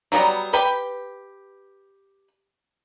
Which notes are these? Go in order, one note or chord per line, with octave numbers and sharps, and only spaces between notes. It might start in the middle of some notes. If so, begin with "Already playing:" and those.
F#3 G3 B3 A4 A#5
G4 B4 G5 B5